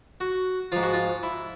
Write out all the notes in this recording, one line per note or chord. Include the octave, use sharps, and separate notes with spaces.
F#4
G#2 F3 F4
F#4
F4
E4